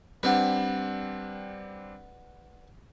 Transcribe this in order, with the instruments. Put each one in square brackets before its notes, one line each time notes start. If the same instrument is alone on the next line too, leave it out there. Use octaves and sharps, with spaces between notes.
[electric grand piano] G3 C4 D4 [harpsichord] B4 D5 F#5